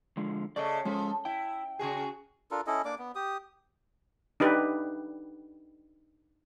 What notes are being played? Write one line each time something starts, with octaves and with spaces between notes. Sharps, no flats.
D3 F3 G#3
C#3 A3 D5 D#5
F3 G#3 C#4 A4
E4 G5
C#3 F#4 G#4
D4 F4 A4 A#4
C#4 E4 A4 D#5
A#3 D4 D5 D6
B3
G4 D#6
D4 D#4 G4 B4